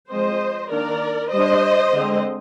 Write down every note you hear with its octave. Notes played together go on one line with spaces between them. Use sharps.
F3 G#3 C4 C5 D#5
D#3 A#3 D4 A#4 D5
G3 D4 C5 D#5
D3 G#3 C4